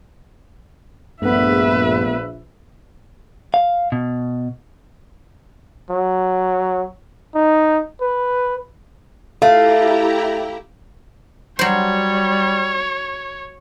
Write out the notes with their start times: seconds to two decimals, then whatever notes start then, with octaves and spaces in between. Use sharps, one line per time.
1.22 A#1 G2 A3 B3 B4 E5
3.54 F5
3.92 B2
5.90 F#3
7.35 D#4
8.01 B4
9.42 A3 E4 G4 F5 A#5
11.59 F#3 G3 C5 C#5